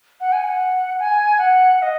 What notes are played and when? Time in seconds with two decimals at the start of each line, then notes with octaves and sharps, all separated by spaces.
0.21 F#5
0.33 G#5
0.45 F#5
0.99 G#5
1.38 F#5
1.77 F#5
1.82 D#5